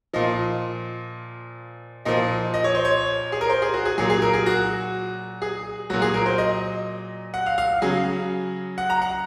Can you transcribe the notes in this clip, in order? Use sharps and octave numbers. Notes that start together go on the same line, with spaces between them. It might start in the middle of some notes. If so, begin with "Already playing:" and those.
A#2 F3 D#5
A#2 F3 D#5
D#5
C#5
C5
C#5
G#4
A#4
C5
G#4
F#4
G#4
A#2 F#3 G#4
G#4
A#4
G#4
F#4
G#4
A#2 F#3 F#4
G#4
A#4
C5
D#5
F#5
F5
F5
C#3 F#3 G#4
F#5
A#5
F#5